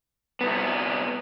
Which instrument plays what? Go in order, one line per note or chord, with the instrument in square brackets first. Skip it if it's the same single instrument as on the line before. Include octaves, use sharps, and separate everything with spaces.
[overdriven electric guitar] C2 B3